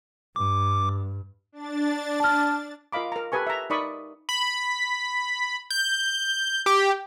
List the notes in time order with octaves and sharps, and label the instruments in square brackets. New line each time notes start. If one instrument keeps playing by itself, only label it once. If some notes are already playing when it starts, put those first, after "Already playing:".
[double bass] G2 [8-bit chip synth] D6
[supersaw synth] D4 A6
[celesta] A5 F6
[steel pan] F4 A#4 D#5 F5 B5 D6
A#4 A#5
G4 A4 B4 G#5 C#6
E5 A#5
D#4 A#4 D5 B5 C#6 D#6
[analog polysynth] B5
G6
G4